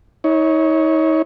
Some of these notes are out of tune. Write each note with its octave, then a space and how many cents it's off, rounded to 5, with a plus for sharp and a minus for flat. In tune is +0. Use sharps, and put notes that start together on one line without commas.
D#4 +40 C#5 +0